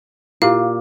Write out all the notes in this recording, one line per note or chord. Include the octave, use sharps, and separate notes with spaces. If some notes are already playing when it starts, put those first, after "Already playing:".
A#2 E4 G4 F5